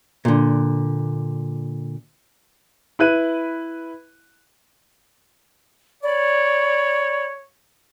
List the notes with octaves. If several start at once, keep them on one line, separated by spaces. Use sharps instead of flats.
A#2 D3
E4 B4 F#6 D#7
C#5 D5 B5